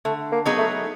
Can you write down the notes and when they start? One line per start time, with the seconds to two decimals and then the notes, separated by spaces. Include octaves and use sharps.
0.05 D3 A3
0.32 A#3
0.45 F#3 B3 D#4 G#4
0.58 A3